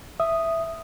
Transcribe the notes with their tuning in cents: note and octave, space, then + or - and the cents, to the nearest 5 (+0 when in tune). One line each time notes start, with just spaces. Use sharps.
E5 +0 D#6 -5